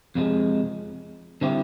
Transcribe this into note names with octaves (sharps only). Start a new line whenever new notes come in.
F2 C3 F3 G#3
D3 G3 C4 E4 G4